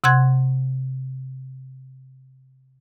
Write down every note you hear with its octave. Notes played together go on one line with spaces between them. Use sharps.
C3 F#5 C6 F#6 G#6